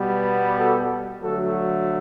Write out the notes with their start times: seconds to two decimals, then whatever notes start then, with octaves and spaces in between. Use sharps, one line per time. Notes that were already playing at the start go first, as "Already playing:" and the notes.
Already playing: B2 G3 B3
0.56 F#4 A4
1.21 D3 F#3 A3 F#4 A4